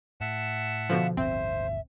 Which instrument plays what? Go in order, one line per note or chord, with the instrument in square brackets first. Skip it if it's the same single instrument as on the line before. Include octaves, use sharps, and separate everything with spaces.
[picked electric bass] A2 [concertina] E5 F#5 A5
[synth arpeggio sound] B2 D3 F3 [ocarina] F5
[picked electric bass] D1 G1 B2 [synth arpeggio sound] C4 [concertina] C5 [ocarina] E5